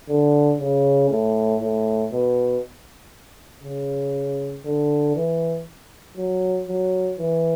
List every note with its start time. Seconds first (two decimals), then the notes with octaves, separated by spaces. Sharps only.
0.08 D3
0.60 C#3
1.10 A2
1.61 A2
2.12 B2
3.63 C#3
4.65 D3
5.15 E3
6.17 F#3
6.68 F#3
7.18 E3